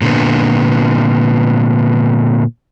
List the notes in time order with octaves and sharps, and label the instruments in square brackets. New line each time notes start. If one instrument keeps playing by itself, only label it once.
[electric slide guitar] A#2 D3 B3